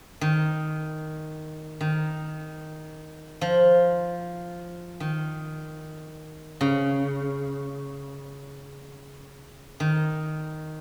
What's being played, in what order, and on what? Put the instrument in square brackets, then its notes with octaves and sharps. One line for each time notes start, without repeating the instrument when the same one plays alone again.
[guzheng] D#3
D#3
F3
D#3
C#3
D#3